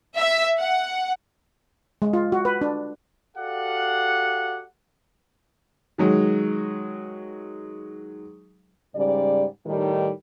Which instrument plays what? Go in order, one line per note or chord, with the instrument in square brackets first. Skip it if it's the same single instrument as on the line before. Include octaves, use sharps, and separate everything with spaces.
[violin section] E5
F#5
[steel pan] G#3
F4
F#4
B4
D4
[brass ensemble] F#4 G4 A4 D5 F5 F#5
[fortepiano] D#3 F#3 G#3
[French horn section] G#2 C#3 G3 D5
A2 D#3 G3 D#4